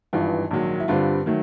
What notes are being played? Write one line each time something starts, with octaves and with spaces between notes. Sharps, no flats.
G#1 G2 E3 F4
A#1 G#2 D#3 F#3
E4
G2 D3 G3 C4 F4
D#3 F#3 A3